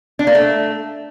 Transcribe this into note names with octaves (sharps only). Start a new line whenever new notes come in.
D4
A#3
A3